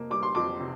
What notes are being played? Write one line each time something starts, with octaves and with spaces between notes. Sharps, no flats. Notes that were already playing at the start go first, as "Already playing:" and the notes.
Already playing: F2 C3 A#3
G3 D6
C6
F2 D6
C3